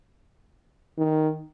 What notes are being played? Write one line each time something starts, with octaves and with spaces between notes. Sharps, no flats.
D#3